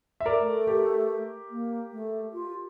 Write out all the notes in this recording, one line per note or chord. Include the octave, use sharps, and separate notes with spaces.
E5
A#4 D5
A3
G4 A#4
A#3
A3
F4